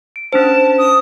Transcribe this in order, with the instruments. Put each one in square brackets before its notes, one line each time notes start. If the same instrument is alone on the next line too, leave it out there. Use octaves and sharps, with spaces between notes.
[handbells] D7
[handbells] C#4 D4 C5 [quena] A5
[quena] D#6